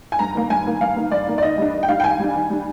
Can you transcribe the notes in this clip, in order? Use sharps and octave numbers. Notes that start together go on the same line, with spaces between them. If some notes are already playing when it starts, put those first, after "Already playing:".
G#5
G2 A#5
D#3 A#3
G2 G#5
D#3 A#3
G2 F5
D#3 A#3
G2 D5
D#3 A#3
D5
D#3 D#5
G3 D4
D#3
G5
G3 D4 F5
G5
D#3 G#5
G3 D4
D#3
G3 D4